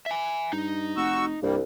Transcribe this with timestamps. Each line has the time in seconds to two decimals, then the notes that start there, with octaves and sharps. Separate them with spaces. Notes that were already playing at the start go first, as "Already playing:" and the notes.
0.06 E5 G#5
0.53 G2 D#4
0.97 F1 F#4 C#6 E6
1.43 C2 G2 G3 A#3